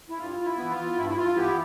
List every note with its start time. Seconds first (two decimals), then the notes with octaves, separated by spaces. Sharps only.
0.10 E4
0.18 G2 F4
0.45 E4
0.58 E3 B3
0.70 F4
0.97 G2 E4
1.09 E4
1.17 F4
1.36 E3 B3 E4 G4